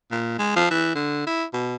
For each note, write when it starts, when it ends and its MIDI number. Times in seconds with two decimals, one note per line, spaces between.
0.11 0.38 46
0.39 0.55 56
0.56 0.66 53
0.70 0.90 52
0.95 1.24 50
1.27 1.44 64
1.54 1.76 47